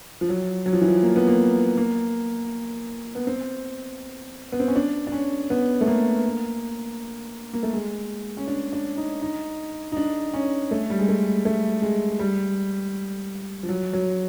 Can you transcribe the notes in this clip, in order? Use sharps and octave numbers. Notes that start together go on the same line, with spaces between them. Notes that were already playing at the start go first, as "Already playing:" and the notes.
F3
F#3
F#3
F3
E3
F3
A#3
B3
A#3
A#3
B3
C4
B3
C4
C#4
D4
D4
C#4
B3
A3
A#3
A#3
A3
G#3
C#4
D4
D4
D#4
D#4
D#4
D4
C#4
A3
G3
G#3
A3
A3
G#3
G3
F3
F#3
F#3